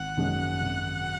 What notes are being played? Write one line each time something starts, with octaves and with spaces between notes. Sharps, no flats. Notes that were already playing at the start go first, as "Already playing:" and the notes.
Already playing: G#1 F#5
F#2 D#3 G#3 C#4
G#1